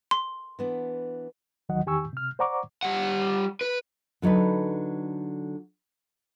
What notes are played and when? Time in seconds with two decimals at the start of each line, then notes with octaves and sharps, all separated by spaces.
0.11 C6
0.59 E3 B3 D4
1.69 D2 D#3 F#3 D#5 F#5
1.86 E2 D#3 G4 G#5 C#6 E6
2.13 C3 F6
2.39 C5 D5 F#5 A#5 C#6 D6
2.83 G3 F#5
3.61 B4
4.22 D3 F#3 D#4 A4 B4